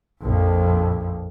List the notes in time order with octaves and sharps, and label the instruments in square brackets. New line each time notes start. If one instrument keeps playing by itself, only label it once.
[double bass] A#1 F2